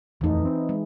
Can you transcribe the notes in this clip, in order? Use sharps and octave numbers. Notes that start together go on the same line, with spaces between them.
D#1 F2 E3 A3 D#4
C4
G#3